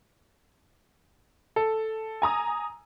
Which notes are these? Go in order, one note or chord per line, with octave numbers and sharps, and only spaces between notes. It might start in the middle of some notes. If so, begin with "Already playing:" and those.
A4
G#5 A#5 D#6